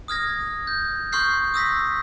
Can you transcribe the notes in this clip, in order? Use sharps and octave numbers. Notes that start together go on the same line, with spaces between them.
D#6 F6 G#6 A#6
G6
C6 C#6 D#6 F6 G6 C7
D#6 E6 A#6 B6